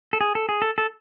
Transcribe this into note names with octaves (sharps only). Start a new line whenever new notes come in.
A4
G#4
A4
G#4
A4
A4